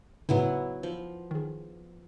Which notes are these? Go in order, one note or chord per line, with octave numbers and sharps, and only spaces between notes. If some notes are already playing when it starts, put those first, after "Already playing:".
A2 C#3 F#3 B3 E4
F3
D#3 G#4